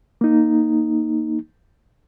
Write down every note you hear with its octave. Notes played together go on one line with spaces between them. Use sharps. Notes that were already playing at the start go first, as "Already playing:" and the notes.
A#3 D#4